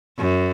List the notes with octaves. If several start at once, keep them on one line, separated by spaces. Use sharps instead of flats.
F#2